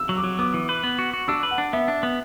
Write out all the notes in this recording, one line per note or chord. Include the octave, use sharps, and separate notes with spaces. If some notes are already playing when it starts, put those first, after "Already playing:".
Already playing: E6
F#3
D6
F#3
B3 D6
E3
B4
B3
F#4
F#4
D4 E6
B4
F#5
D4
B3 E5
D4
B3